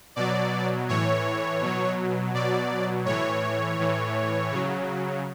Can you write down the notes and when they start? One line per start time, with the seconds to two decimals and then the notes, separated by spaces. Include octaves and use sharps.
0.16 B2 F#3 D5
0.89 A2 E3 C#5
1.61 B2 F#3
2.34 B2 F#3 D5
3.06 A2 E3 C#5
3.78 A2 E3
4.51 C#3 F#3